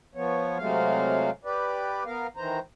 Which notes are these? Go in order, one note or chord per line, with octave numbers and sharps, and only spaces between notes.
F3 B3 C#5
C3 F#3 G#3 A3 F5
G4 B4 D5
B3 A#4 F5
D#3 E3 C5 A#5